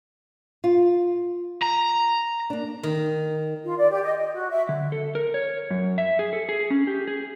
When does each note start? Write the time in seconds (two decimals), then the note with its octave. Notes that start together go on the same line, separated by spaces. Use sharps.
0.64 F4
1.63 A#5
2.50 A#3 D4
2.83 D#3
3.64 F4
3.78 D5
3.91 G4
4.04 D#5
4.17 D#5
4.33 F#4
4.51 E5
4.69 D3
4.92 A4
5.15 A#4
5.34 C#5
5.71 F#2
5.98 E5
6.19 G#4
6.33 A4
6.49 G#4
6.70 C#4
6.87 G4
7.08 G#4